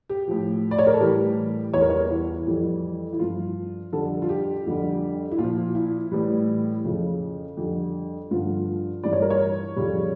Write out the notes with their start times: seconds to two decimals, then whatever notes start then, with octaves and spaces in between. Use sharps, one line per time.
0.09 G4
0.28 A2 F3
0.71 D5
0.79 C#5
0.87 A#4
0.94 A4
1.01 A2 E3 G3 G4
1.74 E2 E3 G3 C#5
1.81 A#4
1.90 C#5
2.10 E4
2.33 E4
2.47 F2 E3 G3
3.13 E4
3.19 G2 F3 F4
3.93 F2 D3 G3 A4
4.22 F4
4.29 G4
4.66 F2 D3 G3
5.31 E4
5.38 A#2 F4
5.44 F3
5.75 E4
6.12 A2 E3 G3
6.84 F2 C#3 F3
7.57 F2 D3 G3
8.31 G2 D3 F3 F4
9.04 G2 E3 G3 D5
9.13 C#5
9.22 A#4
9.30 C#5
9.76 F2 C#3 G3